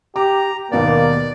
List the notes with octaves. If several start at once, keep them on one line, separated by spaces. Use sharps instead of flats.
G4 A#5 D6
D#2 B2 A#3 B3 D5